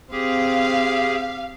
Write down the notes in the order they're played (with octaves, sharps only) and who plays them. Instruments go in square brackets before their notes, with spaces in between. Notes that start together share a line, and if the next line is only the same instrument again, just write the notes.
[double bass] C4 [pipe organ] G4 G#4 [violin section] F5